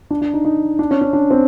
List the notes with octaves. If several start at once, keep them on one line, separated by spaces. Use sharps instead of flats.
D4
D4
D#4
D#4
D4
C#4
C#4
D4
C4